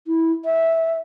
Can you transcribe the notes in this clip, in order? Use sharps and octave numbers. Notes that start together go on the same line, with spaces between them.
E4
E5